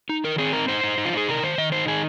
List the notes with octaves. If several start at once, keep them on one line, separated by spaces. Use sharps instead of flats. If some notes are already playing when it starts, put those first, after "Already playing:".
D#4
D#3 A#4
C4 G#4
D#4 A#4
D#4 C5
D#4
D#4
F4
D#4 G#4
C3 A#4
D#3 C5
D#3 D#5
D#4 C5
D#3 G#4